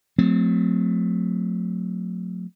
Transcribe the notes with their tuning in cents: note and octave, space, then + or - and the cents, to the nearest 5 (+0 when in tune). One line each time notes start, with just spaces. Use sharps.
F#3 -45 A3 +5 C4 -20